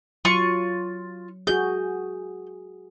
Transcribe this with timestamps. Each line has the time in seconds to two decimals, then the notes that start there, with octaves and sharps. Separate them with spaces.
0.25 F#3 F4 C#6
1.47 F#4 G#4 G6